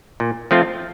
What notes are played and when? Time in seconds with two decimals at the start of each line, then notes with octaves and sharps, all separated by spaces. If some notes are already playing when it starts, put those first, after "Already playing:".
0.20 A#2
0.51 F3 A3 C4 F4